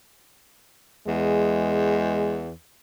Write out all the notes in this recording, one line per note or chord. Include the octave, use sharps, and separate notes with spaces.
E2 G#3